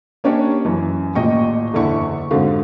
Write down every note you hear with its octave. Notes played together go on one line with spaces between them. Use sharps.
A#3 C#4 D4 G4 C#5
F#2 E3
D#1 A1 A#2 D#5 G5 C#6
F#1 E2 D3 D4 E4 C#6
F2 G#2 D3 F#4 F5